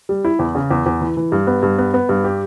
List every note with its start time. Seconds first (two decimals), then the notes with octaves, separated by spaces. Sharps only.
0.09 G3
0.24 E4
0.39 E2
0.55 C#3
0.71 E2
0.86 E2
1.01 E3
1.17 E3
1.32 G2
1.47 B3
1.63 G2
1.79 B3
1.94 B3
2.09 G2
2.24 G4